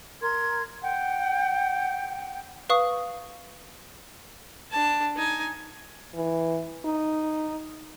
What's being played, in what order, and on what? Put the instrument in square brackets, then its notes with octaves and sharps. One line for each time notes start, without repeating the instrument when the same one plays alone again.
[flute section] A#4 C6 G#6
F#5 G5
[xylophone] B4 F5 C#6 D#6
[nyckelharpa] D4 A5
D#4 G#5
[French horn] E3
D#4